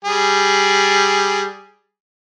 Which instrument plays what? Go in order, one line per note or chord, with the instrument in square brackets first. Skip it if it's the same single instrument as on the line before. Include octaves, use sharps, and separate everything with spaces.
[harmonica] G3 G#4